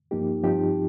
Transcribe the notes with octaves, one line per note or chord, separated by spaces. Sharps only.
G2 F3 A#3 D#4 G4
G2 F3 C4 D#4 G4